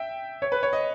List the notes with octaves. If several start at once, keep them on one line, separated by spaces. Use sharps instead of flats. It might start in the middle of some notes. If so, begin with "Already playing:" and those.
Already playing: E5 G5
C#5
B4
C#5
D#5